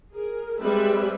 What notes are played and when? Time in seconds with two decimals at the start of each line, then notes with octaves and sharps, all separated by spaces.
0.13 G#4 A#4
0.61 G3 G#3 C4 B4 E5